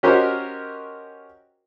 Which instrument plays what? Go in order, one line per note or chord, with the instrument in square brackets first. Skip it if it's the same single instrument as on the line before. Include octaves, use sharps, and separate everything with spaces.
[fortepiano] C#4 F#4 G4 A#4 C5 D#5